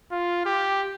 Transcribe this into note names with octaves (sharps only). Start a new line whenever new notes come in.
F4
G4